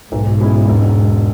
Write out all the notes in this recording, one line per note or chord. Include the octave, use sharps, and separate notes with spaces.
B1 G#2
B2 G#3 C#4 E4
E1